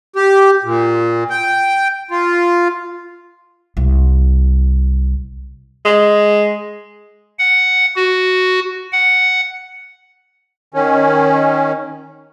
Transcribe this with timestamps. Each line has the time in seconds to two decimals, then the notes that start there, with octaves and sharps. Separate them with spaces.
0.16 G4
0.64 A#2
1.30 G5
2.11 F4
3.77 C2
5.85 G#3
7.39 F#5
7.96 F#4
8.92 F#5
10.74 D#3 C#4